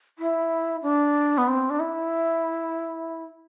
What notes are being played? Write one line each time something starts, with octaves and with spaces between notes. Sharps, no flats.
E4
D4
B3
C4
D4
E4